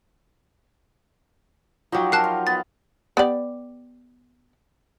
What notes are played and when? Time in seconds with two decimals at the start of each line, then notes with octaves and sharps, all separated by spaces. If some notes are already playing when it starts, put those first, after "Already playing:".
1.92 F3 F#3 D#4 F#4 G4
2.12 A#4 A5 F#6 C7
2.24 F4
2.47 B3 A6
3.17 B3 G4 D5